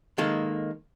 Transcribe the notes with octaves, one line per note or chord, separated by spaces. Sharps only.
D#3 G#3 A#3 A4